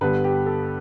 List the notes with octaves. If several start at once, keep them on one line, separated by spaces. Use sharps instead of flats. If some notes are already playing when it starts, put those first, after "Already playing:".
G2 D3 G3 B3 B4
G4
A4